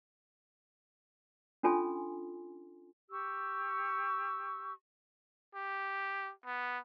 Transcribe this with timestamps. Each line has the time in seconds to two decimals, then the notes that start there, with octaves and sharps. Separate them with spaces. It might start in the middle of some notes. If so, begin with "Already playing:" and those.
1.63 C#4 D4 F4 A4 G#5 C6
3.09 G4 C#6 E6
5.55 G4
6.45 B3